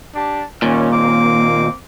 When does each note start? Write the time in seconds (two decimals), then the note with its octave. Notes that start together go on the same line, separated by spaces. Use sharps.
0.15 D4 G4 A5
0.62 D#2 A#2 C#4
0.92 A#3 C4 D6